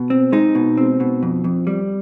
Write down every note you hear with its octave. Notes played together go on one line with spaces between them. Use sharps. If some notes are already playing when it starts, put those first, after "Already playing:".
Already playing: B2
C4
G#3 D#4
B2
C4
B2
F2
F2
G3